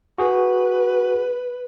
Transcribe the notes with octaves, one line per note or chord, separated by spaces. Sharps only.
F#4 G#4 B4